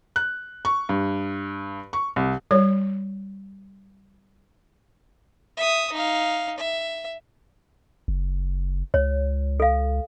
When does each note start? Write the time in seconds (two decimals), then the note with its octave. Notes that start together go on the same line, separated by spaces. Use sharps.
0.16 F#6
0.65 C#6
0.89 G2
1.93 C#6
2.16 C2
2.51 G3 C#5
5.57 E5 D#6
5.93 D#4 F5
6.58 E5
8.08 F#1
8.94 C#2 C#5
9.60 A4 F5